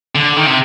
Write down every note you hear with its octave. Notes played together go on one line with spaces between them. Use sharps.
D3
D#3
C3